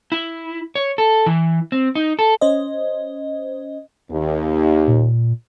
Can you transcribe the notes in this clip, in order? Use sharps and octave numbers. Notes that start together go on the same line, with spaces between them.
E4
C#5
A4
E3
C4
D#4
A4
C#4 C5 D#5
D#2
A#2